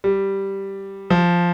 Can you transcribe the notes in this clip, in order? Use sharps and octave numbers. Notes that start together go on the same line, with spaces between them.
G3
F3